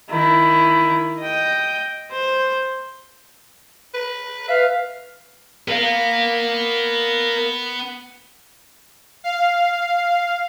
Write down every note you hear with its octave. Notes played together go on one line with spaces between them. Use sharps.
D#3 E4
D#5 G5
C5
B4
B4 E5 F5
B3 A#4 F5
F5